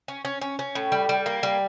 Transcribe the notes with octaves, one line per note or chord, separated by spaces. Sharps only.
C#4
C#4
C#4
C#4
A2
G3
G3
A#3
G3